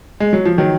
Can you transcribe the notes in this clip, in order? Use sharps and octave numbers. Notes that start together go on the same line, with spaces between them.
G#3
F#3
F3
D#3 F#3